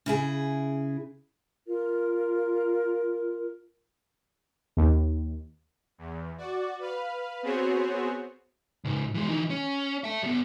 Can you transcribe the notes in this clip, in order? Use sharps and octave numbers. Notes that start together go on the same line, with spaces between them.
C#3 E4 G#4
F4 A#4
D#2
E2
F#4 D5
B4 F5
B3 C4 F#4 G#4 C5 C#5
C#2 G#2
E3 G#3
E3 D#4
C#4
E5 A5
G3 B3